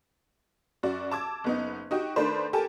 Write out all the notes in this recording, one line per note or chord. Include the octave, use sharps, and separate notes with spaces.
F#2 F#4 D5
A5 D6 E6 G#6
F#1 B3 D#4
D#4 F#4 G4
D#3 A3 D4 B4 C5
G4 A4 A#4 G#5 A5